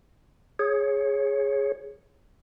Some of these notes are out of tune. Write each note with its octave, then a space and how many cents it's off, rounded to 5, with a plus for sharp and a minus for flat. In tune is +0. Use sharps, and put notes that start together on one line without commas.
G#4 +0 C#5 -10